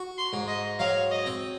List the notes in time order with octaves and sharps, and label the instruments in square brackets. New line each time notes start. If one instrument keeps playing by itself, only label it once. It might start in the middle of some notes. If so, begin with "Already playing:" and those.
Already playing: [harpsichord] F#4
[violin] C6
[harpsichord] G#2
[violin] D#5
[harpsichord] F#3 [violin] F5
[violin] D#5
[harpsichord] C4